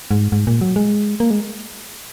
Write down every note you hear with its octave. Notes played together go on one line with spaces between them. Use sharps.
G#2
G#2
A#2
F#3
G#3
A#3
G#3